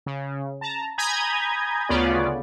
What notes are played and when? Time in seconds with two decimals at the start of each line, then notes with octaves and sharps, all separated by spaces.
0.06 C#3
0.61 A5 A#5
0.98 G#5 A#5 B5 D#6 G6 G#6
1.89 D2 C#3 B3 C#4 F4 D5